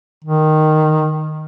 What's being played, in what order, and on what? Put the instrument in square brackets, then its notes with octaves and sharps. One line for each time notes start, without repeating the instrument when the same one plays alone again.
[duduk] D#3